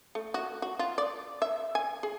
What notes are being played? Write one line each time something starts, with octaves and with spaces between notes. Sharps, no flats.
A3
F#4
F#4
F4
D5
E5
G#5
G#4